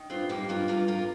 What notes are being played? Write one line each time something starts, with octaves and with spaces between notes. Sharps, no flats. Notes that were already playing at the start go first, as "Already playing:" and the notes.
Already playing: D#3
G2 C4 F4
A#3 D#4 G4
G2 F4 A#4
G2 F4 A#4
G2 F4 A#4